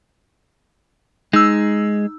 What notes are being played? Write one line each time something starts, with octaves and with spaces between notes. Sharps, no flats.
G#3 D#4 E6